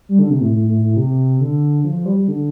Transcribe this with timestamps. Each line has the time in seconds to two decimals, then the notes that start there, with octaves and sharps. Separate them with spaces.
0.09 G3
0.19 D3
0.30 C3
0.41 A2
0.52 A2
0.67 A2
0.82 A2
0.96 C3
1.40 D3
1.84 F3
1.95 F3
2.05 G3
2.17 G3
2.28 D3